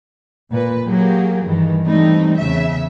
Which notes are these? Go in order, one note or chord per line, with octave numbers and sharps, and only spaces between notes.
A#2 B4
F#3 A#3 G4 G#4
G2 D#3 E3
E3 G3 A3 C4 D#4
E2 C#3 E5